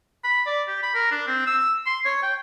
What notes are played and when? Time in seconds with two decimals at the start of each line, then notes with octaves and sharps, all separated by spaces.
0.24 B5
0.47 D5
0.68 G4
0.83 B5
0.95 A#4
1.11 D4
1.27 C4
1.47 E6
1.86 C6
2.05 C#5
2.23 G5